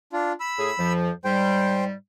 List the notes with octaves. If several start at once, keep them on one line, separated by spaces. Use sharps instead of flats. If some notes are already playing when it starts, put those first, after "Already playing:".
D4 F4
B5 E6
A2 G#4
F2 F3
G#2 G3 C5 G5